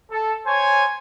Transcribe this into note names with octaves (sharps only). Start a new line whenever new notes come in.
A4
C5 C#5 G#5